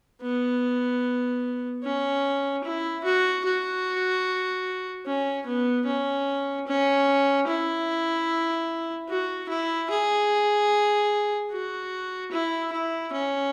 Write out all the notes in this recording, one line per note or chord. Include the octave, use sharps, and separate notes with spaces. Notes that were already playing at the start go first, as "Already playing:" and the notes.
B3
C#4
E4
F#4
F#4
C#4
B3
C#4
C#4
E4
F#4
E4
G#4
F#4
E4
E4
C#4